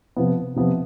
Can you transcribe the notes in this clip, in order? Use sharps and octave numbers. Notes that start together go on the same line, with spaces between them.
C3 F3 B3
C3 F3 B3